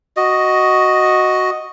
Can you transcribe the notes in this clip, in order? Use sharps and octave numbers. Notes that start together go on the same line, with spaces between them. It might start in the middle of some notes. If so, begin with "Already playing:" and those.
F#4 D#5